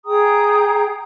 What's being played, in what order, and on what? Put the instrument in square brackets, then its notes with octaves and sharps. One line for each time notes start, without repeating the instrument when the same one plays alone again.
[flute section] G#4 G5 A#5 D#6